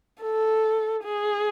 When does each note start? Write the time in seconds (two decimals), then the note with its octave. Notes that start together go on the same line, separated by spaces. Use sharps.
0.22 A4
1.04 G#4